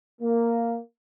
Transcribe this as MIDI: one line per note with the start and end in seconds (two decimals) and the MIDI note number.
0.22 0.77 58